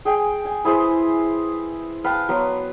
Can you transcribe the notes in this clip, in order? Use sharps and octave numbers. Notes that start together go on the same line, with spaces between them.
G#4 G5 G#5
G#5
E4 G#4 B4 C5
B4 F5 G5 A5
F#3 B3 B4 C6